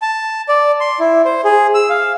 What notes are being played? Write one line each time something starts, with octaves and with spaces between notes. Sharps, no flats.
A5
D5
C6
E4
C5
G#4
E6
F5